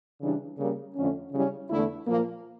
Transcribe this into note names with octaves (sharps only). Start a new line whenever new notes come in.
C#3 E3 G3 D4
C#3 G3 A#3
F2 D3 A3 C#4
C#3 G3 C#4 E4
E2 D3 A3 E4
A#2 F3 A#3